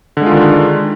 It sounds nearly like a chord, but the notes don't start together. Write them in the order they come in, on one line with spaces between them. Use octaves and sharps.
D3 G#3 F4 D#3 D4